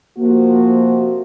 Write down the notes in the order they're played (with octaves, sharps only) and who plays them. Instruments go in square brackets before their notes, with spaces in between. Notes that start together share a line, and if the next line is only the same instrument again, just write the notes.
[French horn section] C3 F3 F#4 [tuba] A#3